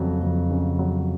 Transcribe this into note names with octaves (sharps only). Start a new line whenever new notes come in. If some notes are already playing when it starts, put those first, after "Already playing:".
Already playing: F2 C#3 F#3
F2
C#3
F#3